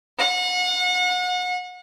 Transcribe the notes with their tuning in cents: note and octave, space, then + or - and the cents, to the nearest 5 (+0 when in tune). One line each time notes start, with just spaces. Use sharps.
F#5 -35